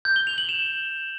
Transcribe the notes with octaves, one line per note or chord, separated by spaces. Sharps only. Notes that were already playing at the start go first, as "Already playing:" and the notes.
G6
G7
F7
F#7
E7